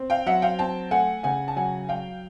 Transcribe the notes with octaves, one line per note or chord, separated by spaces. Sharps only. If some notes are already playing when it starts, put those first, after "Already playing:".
Already playing: C4
F5 G5
F#3 E5 F#5
F5 G5
C4 G5 A5
A3 F#5 G#5
C#3 F#5 G#5
A5
F#3 F#5 G#5
F#3 F5 G5